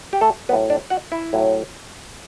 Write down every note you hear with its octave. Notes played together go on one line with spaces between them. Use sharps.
G4
A3 A4
A2 F#3 B3 B4
D4 D5
F#4 F#5
E4 E5
A2 F#3